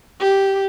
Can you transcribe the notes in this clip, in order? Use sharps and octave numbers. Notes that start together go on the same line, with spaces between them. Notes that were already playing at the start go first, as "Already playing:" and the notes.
G4